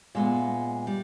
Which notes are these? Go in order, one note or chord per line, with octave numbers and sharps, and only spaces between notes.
A#2 G#3 B3 E5
G3